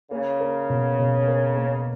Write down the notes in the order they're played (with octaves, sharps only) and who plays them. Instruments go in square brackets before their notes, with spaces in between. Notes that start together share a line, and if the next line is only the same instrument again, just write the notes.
[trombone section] C#3 [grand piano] A#3
[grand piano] A#4
B2
B2
A#4
A#3